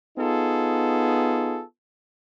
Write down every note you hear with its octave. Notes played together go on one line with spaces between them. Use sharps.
B3 D#4 F4 G#4 A4